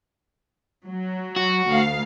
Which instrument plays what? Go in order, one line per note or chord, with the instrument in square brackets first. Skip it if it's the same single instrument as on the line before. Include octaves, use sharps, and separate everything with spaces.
[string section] F#3
[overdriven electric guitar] F#4
[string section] D2 F5